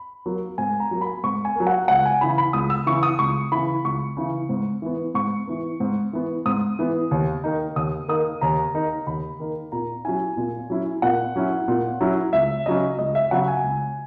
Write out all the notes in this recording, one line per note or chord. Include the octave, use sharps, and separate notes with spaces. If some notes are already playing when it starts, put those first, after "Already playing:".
Already playing: B5
F#3 A#3
G#2 G#5
A#5
F#3 A#3
B5
G#2 C#6
G#5
F#3 A#3
F#5
C#2 F#5
G#5
C#3 E3 B5
B5
C#2 D#6
E6
C#3 E3 C#6
D#6
C#2 C#6
C#3 E3 B5
C#2 C#6
C#3 E3
G#2
E3 B3
G#2 C#6
E3 B3
G#2
E3 B3
G#2 D#6
E3 B3
D#2
D#3 A#3 D#4
D#2 D#6
D#3 A#3 D#4 D#6
D#2 A#5
D#3 A#3 D#4
D#2 B5
D#3 A#3 D#4
A#2 A#5
F#3 C#4 E4 G#5
A#2
F#3 C#4 E4
A#2 F#5
F#3 C#4 E4
A#2
F#3 C#4 E4
C#2 E5
C#3 F#3 C#4 D#5
C#2 D#5
E5
C#3 F#3 C#4 F#5
G#5
C#2